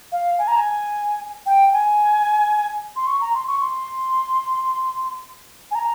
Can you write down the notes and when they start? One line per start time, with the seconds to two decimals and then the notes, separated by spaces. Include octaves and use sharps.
0.12 F5
0.39 G#5
0.48 A#5
0.56 G#5
1.46 G5
1.73 G#5
2.96 C6
3.07 C#6
3.21 A#5
3.34 C6
3.47 C#6
3.61 C6
5.71 G#5
5.75 A#5